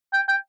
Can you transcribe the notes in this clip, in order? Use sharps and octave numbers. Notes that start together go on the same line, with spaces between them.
G5
G5